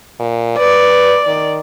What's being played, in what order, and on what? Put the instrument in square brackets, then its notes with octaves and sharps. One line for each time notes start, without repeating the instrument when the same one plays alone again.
[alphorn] A#2
[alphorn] B4 [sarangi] D5
[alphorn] D#3